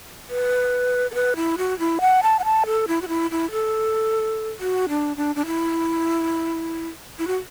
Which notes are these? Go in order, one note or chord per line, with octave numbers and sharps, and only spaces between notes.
B4
A4
B4
E4
F#4
E4
F#5
A5
F#5
A5
A4
E4
F#4
E4
E4
A4
F#4
D4
D4
D4
E4
E4
F#4